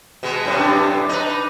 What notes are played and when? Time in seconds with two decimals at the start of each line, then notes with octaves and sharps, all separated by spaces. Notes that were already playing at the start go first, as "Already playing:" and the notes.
0.23 B2 G#3
0.45 F#2 A2 C3
0.59 D4
1.09 D#4 B4